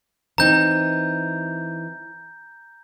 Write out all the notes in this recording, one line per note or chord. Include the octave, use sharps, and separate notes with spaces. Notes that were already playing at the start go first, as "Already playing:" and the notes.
E3 C4 D#4 A#5 G6